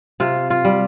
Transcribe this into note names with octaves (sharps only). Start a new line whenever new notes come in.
C3 F4
F4
G3